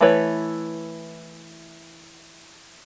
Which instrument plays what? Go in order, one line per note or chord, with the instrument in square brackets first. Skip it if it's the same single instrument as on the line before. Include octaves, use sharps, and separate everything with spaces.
[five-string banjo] E3 A3 E4 B4 C#5